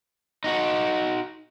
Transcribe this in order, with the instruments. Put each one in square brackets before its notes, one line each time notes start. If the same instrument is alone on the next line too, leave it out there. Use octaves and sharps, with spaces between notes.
[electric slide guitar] D#4 F#4